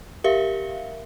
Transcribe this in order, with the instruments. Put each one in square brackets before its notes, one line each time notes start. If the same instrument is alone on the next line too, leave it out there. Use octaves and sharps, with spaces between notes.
[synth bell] G4 A#4 E5 F5